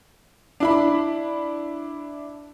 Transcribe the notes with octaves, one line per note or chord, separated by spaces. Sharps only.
D4 E4 B5